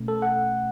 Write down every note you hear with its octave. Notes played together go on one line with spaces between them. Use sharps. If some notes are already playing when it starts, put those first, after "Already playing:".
Already playing: B2 A3 C#4
A4
F#5